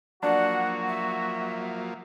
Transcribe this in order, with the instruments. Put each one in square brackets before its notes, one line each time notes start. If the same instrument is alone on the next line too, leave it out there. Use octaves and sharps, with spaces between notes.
[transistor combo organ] F3 F#3 A#3 [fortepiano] D4 [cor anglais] F#4 [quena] F#5
[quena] E5